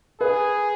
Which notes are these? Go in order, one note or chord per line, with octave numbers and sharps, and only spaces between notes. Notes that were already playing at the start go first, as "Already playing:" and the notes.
G#4 B4